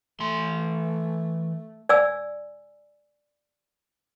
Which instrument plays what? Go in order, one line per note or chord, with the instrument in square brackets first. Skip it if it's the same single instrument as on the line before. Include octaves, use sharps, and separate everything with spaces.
[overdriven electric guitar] E3 C6 [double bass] A3
[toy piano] D5 G#5 E6